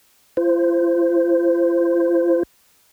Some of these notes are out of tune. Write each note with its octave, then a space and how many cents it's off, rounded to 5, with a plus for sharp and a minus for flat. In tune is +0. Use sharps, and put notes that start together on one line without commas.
F4 -45 C5 -10